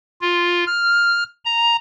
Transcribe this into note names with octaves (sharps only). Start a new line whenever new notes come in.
F4
F6
A#5